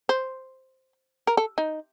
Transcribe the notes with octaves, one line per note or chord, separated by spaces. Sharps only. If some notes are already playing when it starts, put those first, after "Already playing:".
C5
A#4
A4
D#4